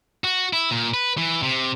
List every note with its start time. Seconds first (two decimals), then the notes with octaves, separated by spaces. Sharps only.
0.24 F#4
0.53 E4
0.71 A#2
0.94 B4
1.18 E3
1.43 C3